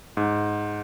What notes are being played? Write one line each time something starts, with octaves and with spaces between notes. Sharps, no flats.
G#2